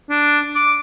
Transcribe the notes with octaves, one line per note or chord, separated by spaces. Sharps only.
D4
D6